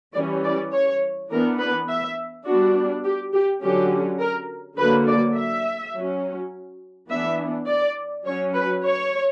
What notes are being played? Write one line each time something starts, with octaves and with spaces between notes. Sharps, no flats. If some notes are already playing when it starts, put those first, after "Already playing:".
E3 G3 C#4 D5
D5
C#5
E3 B3 D4 A#4
B4
E5
G3 B3 D4 F#4
G4
G4
D3 F#3 C#4 G4
A#4
D3 F#3 A#3 B4
D5
E5
F#3 C#4
E3 B3 D4 E5
D5
F#3 C#4 C#5
B4
C#5